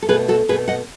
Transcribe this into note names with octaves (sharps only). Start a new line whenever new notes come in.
A4
B2 A3 G#4 B4
F#4 A4
B2 A3 G#4 B4
D#5 F#5